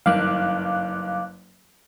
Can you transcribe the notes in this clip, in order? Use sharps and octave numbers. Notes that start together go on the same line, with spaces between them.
F#1 G2 D#3 F5 D6 F#6